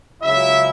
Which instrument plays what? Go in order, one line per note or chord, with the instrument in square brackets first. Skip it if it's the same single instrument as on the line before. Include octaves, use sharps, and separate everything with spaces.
[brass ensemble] C#2 C#3 F#3 E4 E5